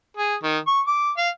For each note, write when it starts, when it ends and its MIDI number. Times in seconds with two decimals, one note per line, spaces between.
0.17 0.35 68
0.43 0.58 51
0.67 0.80 85
0.87 1.11 86
1.17 1.29 77